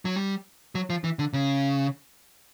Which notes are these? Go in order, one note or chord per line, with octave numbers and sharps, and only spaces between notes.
F#3
G3
F#3
F3
E3
D3
C#3